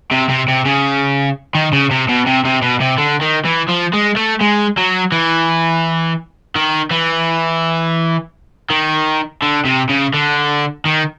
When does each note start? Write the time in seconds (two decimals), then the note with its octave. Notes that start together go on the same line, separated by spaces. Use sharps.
0.12 C3
0.29 C3
0.48 C3
0.65 C#3
1.55 D#3
1.73 C#3
1.91 C3
2.09 B2
2.26 C3
2.45 C3
2.62 B2
2.80 C3
2.98 D3
3.21 D#3
3.45 E3
3.69 F3
3.94 G#3
4.17 A3
4.41 G#3
4.77 F#3
5.12 E3
6.56 D#3
6.91 E3
8.70 D#3
9.42 D3
9.65 C3
9.89 C#3
10.14 D3
10.86 D#3